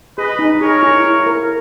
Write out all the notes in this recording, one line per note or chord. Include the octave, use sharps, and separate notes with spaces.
G#4 B4 D#5
D#4
G#4 A#4 C#5
E4
E4
A#4